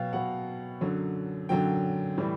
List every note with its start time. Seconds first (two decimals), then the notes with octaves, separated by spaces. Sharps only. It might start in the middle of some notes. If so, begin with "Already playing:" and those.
Already playing: B2 F#3 F5 G5
0.13 B2 F#3 F#5
0.81 F#2 D3 F#3
1.49 F#2 D3 F#3 G5
2.18 A2 E3 G3